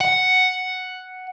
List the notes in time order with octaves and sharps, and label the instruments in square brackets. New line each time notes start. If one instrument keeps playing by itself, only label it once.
[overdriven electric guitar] F#5